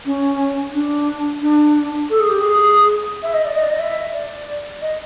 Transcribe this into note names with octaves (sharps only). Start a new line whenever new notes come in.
C#4
D4
D4
A4
G#4
G4
G#4
E5
D#5
D5
D#5
D5
D#5
E5
D5
D#5